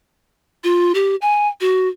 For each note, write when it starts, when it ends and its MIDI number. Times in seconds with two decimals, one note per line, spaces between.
0.64 0.93 65
0.95 1.16 67
1.22 1.48 80
1.61 1.88 66